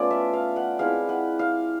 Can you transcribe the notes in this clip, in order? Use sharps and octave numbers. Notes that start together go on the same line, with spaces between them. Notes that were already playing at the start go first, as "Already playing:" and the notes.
Already playing: A3 B3 C#4 F4 D5
E5
F5
F#5
G#3 C4 E4 F5
F#5
F5